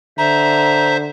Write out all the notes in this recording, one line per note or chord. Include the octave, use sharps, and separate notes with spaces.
D3 C5 E5 A#5